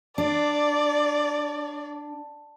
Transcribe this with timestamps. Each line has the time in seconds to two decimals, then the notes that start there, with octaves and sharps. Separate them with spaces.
0.18 D4 D5